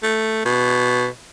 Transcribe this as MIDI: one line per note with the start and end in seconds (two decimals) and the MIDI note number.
0.03 0.42 57
0.45 1.07 47